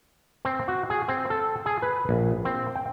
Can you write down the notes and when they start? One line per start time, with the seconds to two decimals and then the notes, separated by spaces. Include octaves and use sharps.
0.45 C4
0.68 F#4
0.90 G#4
1.08 C4
1.30 A4
1.66 G#4
1.82 B4
2.09 A#1
2.45 C4
2.75 G5